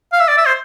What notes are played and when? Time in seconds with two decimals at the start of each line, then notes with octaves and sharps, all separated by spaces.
0.13 F5
0.20 E5
0.28 D5
0.37 E5
0.46 C5